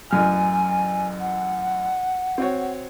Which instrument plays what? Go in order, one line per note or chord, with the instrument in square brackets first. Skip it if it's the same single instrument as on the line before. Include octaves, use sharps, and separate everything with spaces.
[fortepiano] A1 F#2 F6 [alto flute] G#5
[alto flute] F#5
[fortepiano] C4 F#4 C#5